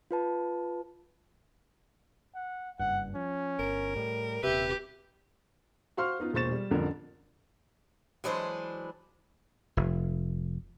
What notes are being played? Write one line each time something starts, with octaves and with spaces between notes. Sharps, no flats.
F4 B4 A5
F#5
F#1 G2 F#5
F3 C#4
G1 A#4
A2 G3
D#1 C3 G4 B4 E5
F#4 C5 F5 C6 C#6 F6
B3 D#4 F4
E1 A#2 C5 C#6 A6 E7
G3
A1 F2 D3 A#4
E3 F#3 G#3 D4 B4 C5
F1